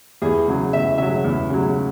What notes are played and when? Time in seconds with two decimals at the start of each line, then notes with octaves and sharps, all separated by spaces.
0.22 E2 G#4
0.48 C#3 F#3
0.73 E2 E5
0.98 C#3 F#3 E5
1.24 E2
1.50 C#3 F#3